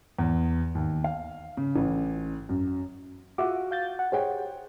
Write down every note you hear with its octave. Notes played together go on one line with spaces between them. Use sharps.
E2
D#2
F5
C#3
A1
F#2
F4 F#4 E5 D6
F5 G6 A6
F#5
G4 G#4 C5 C#5 F#5 G5